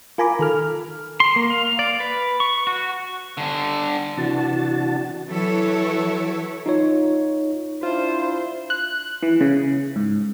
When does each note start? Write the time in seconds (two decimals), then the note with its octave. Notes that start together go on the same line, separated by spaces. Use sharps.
0.18 F4 A#4 G#5 A#5 B5 D6
0.39 D#3 A4 F6
1.20 C6
1.36 A#3
1.50 F5
1.79 D5
2.00 B4
2.40 C#6
2.67 F#4
3.37 G2 D3
4.17 C3 E3 D4 F#4 A5
5.28 E3 F#3 E4 A4 C#5
6.66 D#4 F4 C#5
7.83 D4 E4 F4 C5
8.70 F#6
9.23 E3
9.41 C#3
9.96 G#2